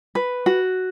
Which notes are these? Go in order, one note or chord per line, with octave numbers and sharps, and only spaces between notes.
B4
F#4